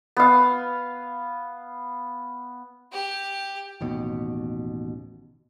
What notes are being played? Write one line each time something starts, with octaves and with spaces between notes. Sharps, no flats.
B3 F5
G4
A1 D#2 B2